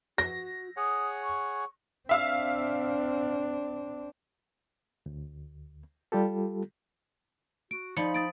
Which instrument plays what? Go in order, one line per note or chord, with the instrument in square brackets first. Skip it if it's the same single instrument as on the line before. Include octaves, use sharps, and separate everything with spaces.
[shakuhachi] F#4 [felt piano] A#6
[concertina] G#4 C#5 F#5 [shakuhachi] D#6
[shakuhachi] C#6
[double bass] C4 D4 [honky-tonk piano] E5 F5 E6
[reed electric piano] D2
G3 F4 G4 A4
[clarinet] F#4 [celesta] D7
[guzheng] F3 [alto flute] D#4 [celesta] D5 C#7 [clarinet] B5
[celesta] D#6 A6 D7